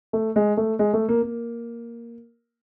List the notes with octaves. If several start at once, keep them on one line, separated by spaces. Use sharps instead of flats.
A3
G#3
A3
G#3
A3
A#3
A#3